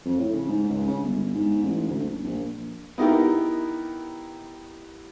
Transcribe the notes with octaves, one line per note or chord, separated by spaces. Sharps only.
F2
A2
C#3
G#2
C#2
C#3
G1
G#2
A1
D2
F#1
A#1
B3 D#4 E4 G4 A#4